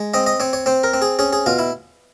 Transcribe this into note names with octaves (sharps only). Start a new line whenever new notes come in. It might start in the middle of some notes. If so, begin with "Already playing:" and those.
Already playing: G#3
C4 D#5
D#5
C4 C#5
C#5
C4 C5
A#4
C4
G#4
C#4 G#4
G#4
B2 F4
E4